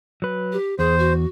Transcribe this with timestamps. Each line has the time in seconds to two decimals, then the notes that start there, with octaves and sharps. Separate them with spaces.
0.22 F#3 B4
0.52 G4
0.79 E2 G#4 C5
0.99 F#4